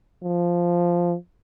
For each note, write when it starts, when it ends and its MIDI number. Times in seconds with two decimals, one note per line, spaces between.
0.23 1.15 53